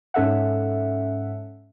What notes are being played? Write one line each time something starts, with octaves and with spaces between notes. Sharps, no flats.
G#2 C#4 A4 E5 F#5